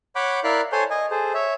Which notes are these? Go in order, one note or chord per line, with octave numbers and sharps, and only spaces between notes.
C#5 F#5 B5 D6 G6
E4 A#4 D5 F5 B5 F#6
A4 C5 C#5 G#5 C6
D#5 G#5
G#4 A4 C5
C#5 E5